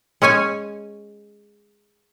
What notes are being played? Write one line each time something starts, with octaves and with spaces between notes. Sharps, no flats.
G#3 C#4 C#5 G#5